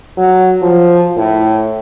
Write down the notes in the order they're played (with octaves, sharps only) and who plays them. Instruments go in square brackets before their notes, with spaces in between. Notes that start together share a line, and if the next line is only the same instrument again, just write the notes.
[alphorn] F#3
F3
A2